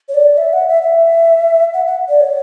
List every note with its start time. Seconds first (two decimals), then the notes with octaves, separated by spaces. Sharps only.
0.09 C#5
0.14 D5
0.37 E5
0.53 F#5
0.68 E5
0.82 E5
1.74 F#5
1.86 F#5
2.09 D5
2.20 C#5